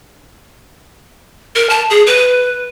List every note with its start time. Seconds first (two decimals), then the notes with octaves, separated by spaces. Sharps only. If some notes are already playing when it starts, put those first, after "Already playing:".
1.55 A#4
1.70 A5
1.90 G#4
2.07 B4